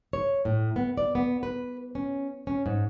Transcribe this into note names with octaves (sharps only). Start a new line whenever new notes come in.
C#5
A2
B3
D5
B3
B4
C#4
C#4
G#2